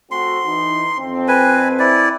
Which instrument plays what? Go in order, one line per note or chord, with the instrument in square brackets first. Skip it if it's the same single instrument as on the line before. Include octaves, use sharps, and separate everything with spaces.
[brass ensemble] A3 C4 F#4 [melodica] C6
[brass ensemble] E3 D#4
F2 C4
[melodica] B4 G#5
E4 D5